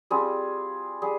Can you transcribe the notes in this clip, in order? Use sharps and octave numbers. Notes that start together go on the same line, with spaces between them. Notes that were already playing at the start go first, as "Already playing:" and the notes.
G3 C4 F4 G#4
G3 G#4